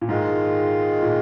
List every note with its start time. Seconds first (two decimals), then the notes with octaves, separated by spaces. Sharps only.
0.01 A#2
0.08 G#2 D#3 G#3 F4
1.03 A#2